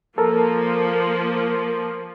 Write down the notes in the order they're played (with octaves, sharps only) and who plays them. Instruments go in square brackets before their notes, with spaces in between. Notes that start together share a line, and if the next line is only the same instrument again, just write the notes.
[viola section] F3 A#3 [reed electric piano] A4 A#4